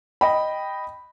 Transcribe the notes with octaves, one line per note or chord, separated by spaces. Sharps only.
D#5 G5 B5